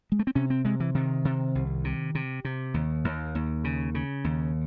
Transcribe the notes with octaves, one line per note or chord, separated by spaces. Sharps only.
G#3
A3
C4
C3 C#4
C4
C3 G#3
E3
C3 D#3
C3
C2
C3
C3
C3
D#2
D#2
D#2
C#3
C#3
D#2